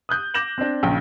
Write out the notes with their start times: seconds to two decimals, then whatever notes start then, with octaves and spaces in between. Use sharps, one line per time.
0.09 D#6 F#6 G6
0.34 D6 G6 A#6 E7 F#7
0.58 C4 D4
0.83 A#1 C#3 G5